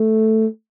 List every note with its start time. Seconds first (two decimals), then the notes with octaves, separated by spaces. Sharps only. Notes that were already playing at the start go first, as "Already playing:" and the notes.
Already playing: A3